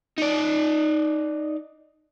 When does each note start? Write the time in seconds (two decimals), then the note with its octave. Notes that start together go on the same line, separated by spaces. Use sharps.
0.18 D#4 D5